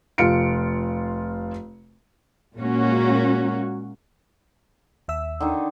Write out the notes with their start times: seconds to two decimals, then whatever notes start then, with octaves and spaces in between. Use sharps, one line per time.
0.18 F1 F4 F5 C#7 D7
2.55 A#2 G#3 A#3 C#4 F#4
5.08 D#2 E5 E6
5.40 D3 D#3 D#4